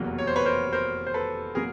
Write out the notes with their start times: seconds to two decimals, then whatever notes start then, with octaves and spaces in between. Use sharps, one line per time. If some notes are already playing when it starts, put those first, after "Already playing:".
Already playing: F1 E2 B2 F#3 A#3
0.18 C#5
0.27 C5
0.36 B4 C#5
0.45 A#4 C5
0.73 A#4 C5
1.07 C5
1.14 A4 B4
1.55 B2 F#3 A#3 G#4 A#4